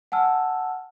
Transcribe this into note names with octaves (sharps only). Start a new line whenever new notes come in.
F#5 G#5 A5 E6 F6